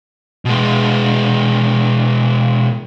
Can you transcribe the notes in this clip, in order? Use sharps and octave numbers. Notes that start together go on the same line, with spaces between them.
B2 G#3